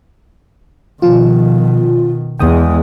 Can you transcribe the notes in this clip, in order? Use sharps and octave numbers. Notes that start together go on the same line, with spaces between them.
B2 D#3 F3 F4
E2 G#3 G5 D#6